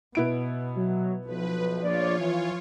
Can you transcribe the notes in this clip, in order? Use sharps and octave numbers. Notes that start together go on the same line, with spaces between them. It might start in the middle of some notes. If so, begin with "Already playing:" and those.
B2 B3 E4 D7
F#3
B1 F3 B4
A#1 F4 C#5 D5
E3